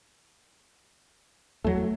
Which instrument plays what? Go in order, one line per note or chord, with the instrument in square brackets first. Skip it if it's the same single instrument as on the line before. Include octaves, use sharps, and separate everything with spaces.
[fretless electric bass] E2 F#3 [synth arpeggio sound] A3